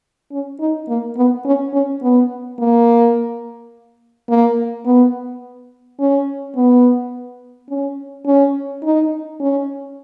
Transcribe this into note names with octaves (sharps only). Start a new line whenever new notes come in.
C#4
D#4
A#3
B3
C#4
C#4
B3
A#3
A#3
B3
C#4
B3
C#4
C#4
D#4
C#4